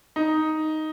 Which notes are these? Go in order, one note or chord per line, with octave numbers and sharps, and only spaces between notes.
D#4